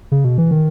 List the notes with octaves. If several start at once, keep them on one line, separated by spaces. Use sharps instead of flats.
C#3
B2
E3
D#3